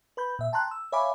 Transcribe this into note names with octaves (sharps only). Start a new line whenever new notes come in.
B4 B5 G6
A#2 E5
G5 A5 A#5 C6 F#6
E6
C#5 E5 F5 G#5 B5 D6